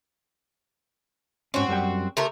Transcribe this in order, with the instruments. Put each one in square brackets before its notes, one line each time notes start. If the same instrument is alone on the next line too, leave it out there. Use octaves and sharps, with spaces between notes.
[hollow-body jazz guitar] G#2 C#4 [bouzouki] C4 F#4
[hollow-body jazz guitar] F#2 G3 G5
[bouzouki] C3 A3 A#4